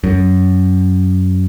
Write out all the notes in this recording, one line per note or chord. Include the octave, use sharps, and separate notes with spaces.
F#2